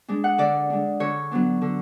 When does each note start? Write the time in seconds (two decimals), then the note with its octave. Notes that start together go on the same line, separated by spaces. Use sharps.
0.08 G#3 D4
0.24 F#5
0.38 D3 D5
0.70 G#3 D4
1.00 D3 C#5
1.31 F#3 B3 D4
1.62 D3